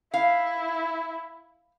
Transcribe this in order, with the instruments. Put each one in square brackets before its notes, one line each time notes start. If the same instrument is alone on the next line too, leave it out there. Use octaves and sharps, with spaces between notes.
[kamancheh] E4 [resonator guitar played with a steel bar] F5